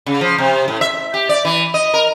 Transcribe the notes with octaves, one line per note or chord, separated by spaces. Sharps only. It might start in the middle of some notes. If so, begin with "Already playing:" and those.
C#3
F3
C3
A2
E5
G4
D5
E3
D#5
A#4